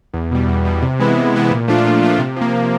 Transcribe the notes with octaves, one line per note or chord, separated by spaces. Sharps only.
E2
B2 G3
E2
B2 G3
C3
E3 G#3 B3 E4
C3
E3 G#3 B3 E4
A#2
F3 A3 D4 F4
A#2
F3 A3 D4 F4
C3
F3 A#3
C3